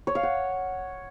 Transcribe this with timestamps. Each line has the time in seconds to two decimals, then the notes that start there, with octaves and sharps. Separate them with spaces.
0.07 C#5
0.15 F5
0.23 F#5